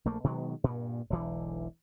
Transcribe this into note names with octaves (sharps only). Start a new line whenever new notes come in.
A#1 A3 A#3
B2 D#3 F#3 G#3
G2 A#2
E1 B1 D3 E3